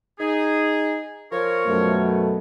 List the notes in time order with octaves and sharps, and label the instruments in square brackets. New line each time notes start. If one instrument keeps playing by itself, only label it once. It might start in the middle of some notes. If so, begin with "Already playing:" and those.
[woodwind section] D#4 G#4
F3 A#4 C#5
[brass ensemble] F#2 B2 A3